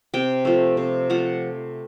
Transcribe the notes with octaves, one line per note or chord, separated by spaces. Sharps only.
C3 G5
F3 A3
C3
F3 A3 F#5